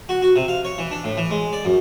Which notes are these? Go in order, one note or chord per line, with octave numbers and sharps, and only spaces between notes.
F#4
F#4
C3
F5
C#5
E3
D4
A2
E3
G#3
D5
F#2